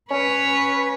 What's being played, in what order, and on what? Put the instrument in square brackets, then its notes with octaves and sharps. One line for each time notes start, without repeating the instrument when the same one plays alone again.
[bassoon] C#4 [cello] B4 [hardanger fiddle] C#5